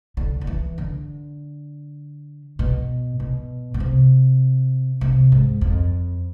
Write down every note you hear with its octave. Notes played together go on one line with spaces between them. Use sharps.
D3
D3
E3
D3
B2
B2
B2
C3
C3
G#2
F2